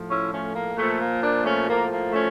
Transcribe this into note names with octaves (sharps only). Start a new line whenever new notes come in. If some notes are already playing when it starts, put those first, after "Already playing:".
Already playing: A2 F3
C#4 E4
A3 C#4
A#3
A#2 F3 A3
A#3
A#3 D4
A3 C#4
A2 F3 A#3
A#3
A3 C#4